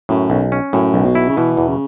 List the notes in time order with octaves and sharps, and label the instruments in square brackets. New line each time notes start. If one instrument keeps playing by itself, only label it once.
[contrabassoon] F#2 [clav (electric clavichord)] A2
[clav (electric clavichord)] B1
C#4
[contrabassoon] F#2 [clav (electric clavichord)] A2
[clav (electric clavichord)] B1
[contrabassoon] B2
[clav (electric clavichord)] E4
[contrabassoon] C#3
[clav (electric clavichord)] B2 [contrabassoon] E3
[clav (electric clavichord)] E2
[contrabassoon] C#3